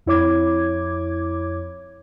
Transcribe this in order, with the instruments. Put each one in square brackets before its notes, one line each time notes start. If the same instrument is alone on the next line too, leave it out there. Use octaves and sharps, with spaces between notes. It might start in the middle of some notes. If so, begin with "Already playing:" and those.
[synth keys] F2 E4 C#5 D6 G#6